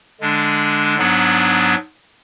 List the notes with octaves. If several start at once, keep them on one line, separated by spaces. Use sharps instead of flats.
D3 G#3 D4
G#2 F#3 B3 D4